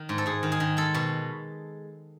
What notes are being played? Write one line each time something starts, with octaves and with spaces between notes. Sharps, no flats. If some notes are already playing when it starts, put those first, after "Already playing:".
Already playing: D#3
G#2
A4
G#2 G#4
D#3
G#4
D#3
G#3 A4
B2